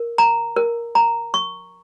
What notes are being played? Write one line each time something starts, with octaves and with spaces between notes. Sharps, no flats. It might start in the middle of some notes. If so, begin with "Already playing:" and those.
Already playing: A#4
A#5
A#4
A#5
C#6